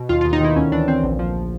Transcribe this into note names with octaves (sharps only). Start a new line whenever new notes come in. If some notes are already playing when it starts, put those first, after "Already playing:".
Already playing: B2
D#2 F4
D#2 F4
D#4
D#3 E4
D2 C#4
E3 D4
D2 C4
A#1
F3